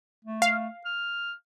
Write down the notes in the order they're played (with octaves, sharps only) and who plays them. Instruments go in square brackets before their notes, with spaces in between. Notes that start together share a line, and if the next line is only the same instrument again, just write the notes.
[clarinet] A3
[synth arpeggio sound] F5
[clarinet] F6